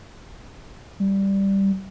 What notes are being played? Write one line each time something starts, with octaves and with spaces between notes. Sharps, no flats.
G3